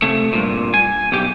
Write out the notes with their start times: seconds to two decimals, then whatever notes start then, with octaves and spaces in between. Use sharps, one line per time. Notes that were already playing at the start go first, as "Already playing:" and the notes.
0.02 C3 A3
0.33 G2 A#2
0.74 G#5
1.12 B1 G4